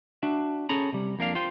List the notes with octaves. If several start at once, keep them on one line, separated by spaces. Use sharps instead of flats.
D4 F#4 E5
C#4 G#4 A4 A#5 B5
C3 G3
F2 A#3 D4 F5
F4 C5 G5